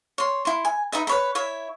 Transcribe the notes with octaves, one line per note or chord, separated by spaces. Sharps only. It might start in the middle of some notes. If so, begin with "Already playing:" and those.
C#5 C6
E4 C6
G#5
D#4 B4 D#5 E5
B4 C#5 B5
E4 C#5 E5